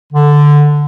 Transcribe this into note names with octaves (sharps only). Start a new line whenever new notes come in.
D3